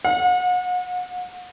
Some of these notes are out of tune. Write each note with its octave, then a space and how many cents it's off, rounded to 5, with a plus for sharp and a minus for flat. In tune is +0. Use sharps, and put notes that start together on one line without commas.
F#5 -35